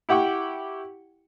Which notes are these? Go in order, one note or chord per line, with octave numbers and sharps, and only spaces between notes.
E4 G4 F#5 G5 C#6